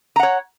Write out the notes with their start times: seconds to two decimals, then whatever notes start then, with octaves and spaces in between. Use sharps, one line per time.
0.16 A#5
0.20 F#5
0.23 C#5